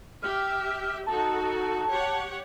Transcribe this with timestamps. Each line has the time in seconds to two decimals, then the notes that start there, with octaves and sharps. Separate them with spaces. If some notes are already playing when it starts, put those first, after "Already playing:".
0.23 G4 E5 F6
1.06 D#4 F#4 A4 A5
1.89 G4 C#5 F#5